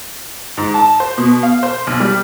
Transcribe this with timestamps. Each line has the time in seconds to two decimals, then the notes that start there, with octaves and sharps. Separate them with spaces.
0.57 G#2
0.74 A5
1.00 C5
1.18 B2
1.43 F5
1.63 C5
1.87 B1
2.00 G3